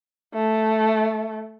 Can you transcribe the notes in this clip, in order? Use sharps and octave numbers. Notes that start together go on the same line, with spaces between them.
A3